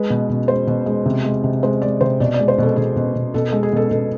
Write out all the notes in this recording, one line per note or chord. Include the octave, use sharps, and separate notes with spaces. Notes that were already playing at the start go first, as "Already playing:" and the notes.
Already playing: G#3 B4
B2
B2
G#3 C5
B2
G#3
C3
G#3
C3
G#3 C5
G#3 D5
C3 C5
B2 D5
D5
G#3
C5
B2 A4
B2 G#4
B2
B2
B2 A4
G#3 A4
G#4
B2 A4
B2 A4